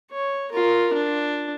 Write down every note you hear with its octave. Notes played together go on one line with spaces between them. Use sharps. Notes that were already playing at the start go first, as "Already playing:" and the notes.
C#5
F4 A#4
D4